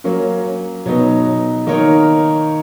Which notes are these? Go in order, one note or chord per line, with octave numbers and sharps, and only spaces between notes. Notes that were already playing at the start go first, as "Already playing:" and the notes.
F#3 A#3 C#4
B2 F#3 B3 D#4
D#3 A#3 D#4 A#4 C#5